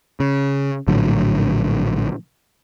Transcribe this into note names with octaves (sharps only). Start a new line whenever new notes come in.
C#3
A#1 A2 D3 F#3